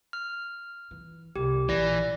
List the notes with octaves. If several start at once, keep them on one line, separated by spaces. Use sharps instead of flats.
F6
E3
C2 G4
A#1 E3 D5 A#6